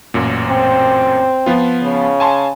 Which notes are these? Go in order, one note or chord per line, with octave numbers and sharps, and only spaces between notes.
A1 F#2 A#2
C4
F3 B3 F4
C#3
G#5 A5 C6